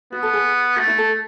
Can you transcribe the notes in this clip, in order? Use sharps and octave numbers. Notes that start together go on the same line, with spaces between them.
B3 F#4
A4
G#4
A3 F#4
E4
A4